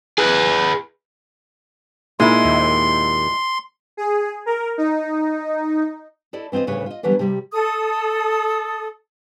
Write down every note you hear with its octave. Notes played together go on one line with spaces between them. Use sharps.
G#4 B4
A#2 G#3 D#4 E4 C6
D#2
G#4
A#4
D#4
E4 A4 D5 D#5
E3 C4 F4 C5 D#5
D2 A2 C#3 G3 B4 C#5
F4 D#5
D3 E3 F#3 G3 B3
C3 G3
A4 D#6